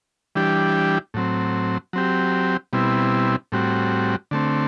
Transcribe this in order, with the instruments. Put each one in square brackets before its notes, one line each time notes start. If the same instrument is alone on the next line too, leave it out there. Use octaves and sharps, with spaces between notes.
[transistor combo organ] E3 G3 D4 G4
A2 F#3 C4
F#3 C4 G4
B2 G3 C4 E4
A2 G3 C4 F#4
D3 A3 C4